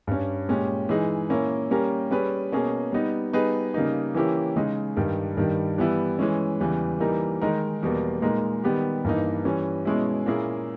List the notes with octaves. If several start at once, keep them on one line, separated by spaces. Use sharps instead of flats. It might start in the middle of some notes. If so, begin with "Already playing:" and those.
G2 G3 C#4
A#2 G#3 C#4 G4
E3 G#3 D#4 G#4
A#2 A#3 C#4 E4
G3 A#3 C#4 G4 A#4
G3 C#4 G#4 B4
B2 A#3 C#4 G#4
G3 B3 D#4
G3 B3 D#4 G#4 B4
C#3 G3 A#3 D#4
E3 A#3 C#4 E4 G4
C#3 G#3 D#4
G2 D#3 G3
G2 D#3 G3
E3 G3 B3 E4
E3 G#3 C#4
E2 C#3 E3 G3
E3 G3 A#3 D#4 A#4
D#3 G#3 D#4 A#4
E2 B2 G3 A#3
A#2 G#3 D#4 A#4
D#3 G3 B3 G4
G2 E3 A#3 D#4
E3 G3 C#4
B2 G#3 C#4 E4
A#2 A#3 C#4 E4 G#4